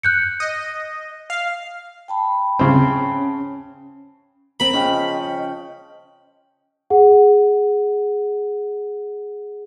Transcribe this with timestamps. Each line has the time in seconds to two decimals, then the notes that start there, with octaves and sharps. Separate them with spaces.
0.03 F#6 G6 C#7
0.40 D#5
1.30 F5
2.08 G5 A5 B5
2.59 C#3 C4 C#4
4.60 C4 A#4 B5
4.73 C#3 F3 C#4 D#5 G5
6.90 G#4 F#5